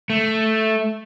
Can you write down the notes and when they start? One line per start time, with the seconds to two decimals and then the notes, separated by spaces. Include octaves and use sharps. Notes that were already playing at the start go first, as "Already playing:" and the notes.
0.10 A3